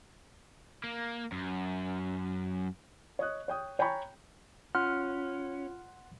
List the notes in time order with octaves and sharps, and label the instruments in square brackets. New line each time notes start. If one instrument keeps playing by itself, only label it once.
[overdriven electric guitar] A#3
F#2
[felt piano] C#5 D#5 D#6 F#6
C#5 G5 D#6
C#5 G5 G#5 A#5 B5 C#6
[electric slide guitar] C#4 [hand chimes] F4 [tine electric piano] F#5 C6 F#6 [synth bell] F6